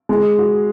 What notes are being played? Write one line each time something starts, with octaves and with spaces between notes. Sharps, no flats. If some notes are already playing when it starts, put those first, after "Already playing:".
G#3
F#4